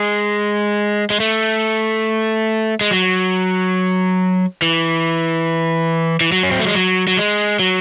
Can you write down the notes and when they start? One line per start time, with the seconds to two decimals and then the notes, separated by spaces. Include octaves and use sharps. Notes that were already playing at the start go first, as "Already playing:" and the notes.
Already playing: G#3
1.10 G#3
1.20 A3
2.81 G#3
2.91 F#3
4.62 E3
6.21 E3
6.32 F#3
6.43 C#4
6.51 C4
6.59 A3
6.67 G#3
6.75 F#3
7.07 F#3
7.17 G#3
7.60 F#3